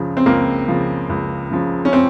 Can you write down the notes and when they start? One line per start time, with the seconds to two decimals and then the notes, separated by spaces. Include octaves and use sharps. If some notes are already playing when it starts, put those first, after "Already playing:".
Already playing: C#2 C#3 F3
0.17 C4
0.26 C#2 A#3
0.68 C#3 F3
1.10 C#2
1.51 C#3 F3
1.85 C#4
1.93 C4